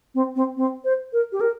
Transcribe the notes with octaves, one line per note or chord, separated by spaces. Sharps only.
C4
C4
C4
C5
A#4
G4
A#4